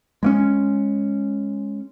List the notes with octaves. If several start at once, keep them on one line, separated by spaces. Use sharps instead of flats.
G#3 A#3 C#4